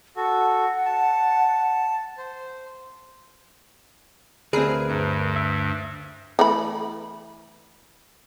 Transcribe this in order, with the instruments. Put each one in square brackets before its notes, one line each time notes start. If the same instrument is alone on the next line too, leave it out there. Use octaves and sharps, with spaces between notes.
[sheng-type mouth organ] F#4 A4 [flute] F#5
[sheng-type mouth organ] A5
C5
[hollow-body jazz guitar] D2 C4 [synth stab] G#4 [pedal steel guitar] A#4 B4
[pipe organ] G2
[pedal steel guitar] E5
[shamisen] E3 A3 B5